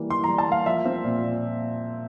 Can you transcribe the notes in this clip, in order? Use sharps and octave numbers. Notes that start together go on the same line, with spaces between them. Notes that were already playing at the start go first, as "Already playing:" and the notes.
Already playing: E3 G3 A#3
E3 C6
A#5
G3
A5
A#3 F5
F3 E5
C4
A#2
A#2